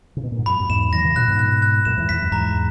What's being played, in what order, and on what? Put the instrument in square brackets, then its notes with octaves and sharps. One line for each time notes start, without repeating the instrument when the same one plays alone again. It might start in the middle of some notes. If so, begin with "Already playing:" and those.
[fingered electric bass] C#3
B2
A#2
G#2
[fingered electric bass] F#2 [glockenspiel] B5
[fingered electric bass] F#2
[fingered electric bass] E2 G#2 [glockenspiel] E7
[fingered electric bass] D#3 F#3 [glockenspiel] A#6
[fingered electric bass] C#3 E3
[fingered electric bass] A#2 C#3 [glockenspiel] F#6
[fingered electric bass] G#2 B2
[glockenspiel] F#6
F#6
[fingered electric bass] F#2 A#2 [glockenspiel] E7
[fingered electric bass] E2 G#2
[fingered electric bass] E2 [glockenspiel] B6
[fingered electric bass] F#2
[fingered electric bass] E2 G#2 [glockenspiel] A#5